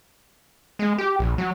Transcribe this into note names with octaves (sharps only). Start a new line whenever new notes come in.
G#3
G4
A#1
F#3